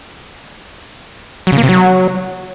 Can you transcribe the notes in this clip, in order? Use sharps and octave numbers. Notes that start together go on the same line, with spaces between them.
F#3
C#3
A#3
C3
F#3